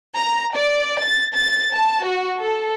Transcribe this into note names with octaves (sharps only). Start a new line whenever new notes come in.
A#5
D5
A6
A6
A5
F#4
A4